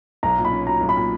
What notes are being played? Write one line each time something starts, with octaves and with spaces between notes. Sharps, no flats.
B1 A#5
A#2
B5
C#4
F#3 A#5
B1
B5
A#2